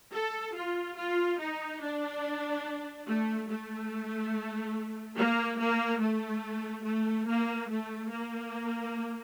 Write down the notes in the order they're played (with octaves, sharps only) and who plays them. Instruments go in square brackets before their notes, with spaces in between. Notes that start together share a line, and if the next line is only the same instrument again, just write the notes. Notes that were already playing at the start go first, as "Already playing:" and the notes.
[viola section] A4
F4
F4
D#4
D4
A3
A3
A#3
A#3
A3
A3
A#3
A3
A#3